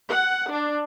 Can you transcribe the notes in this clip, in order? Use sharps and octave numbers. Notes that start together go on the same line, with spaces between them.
F#5
D4